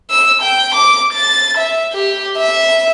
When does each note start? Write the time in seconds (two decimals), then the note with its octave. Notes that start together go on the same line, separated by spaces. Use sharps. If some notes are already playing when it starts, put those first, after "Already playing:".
0.11 E6
0.42 G5
0.75 D6
1.12 A6
1.57 E5
1.93 G4
2.37 E5